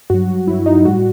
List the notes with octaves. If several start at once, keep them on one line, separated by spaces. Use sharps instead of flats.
G2 F#3 F#4
G2 F#3 E4
D#4
A2 G3 F#4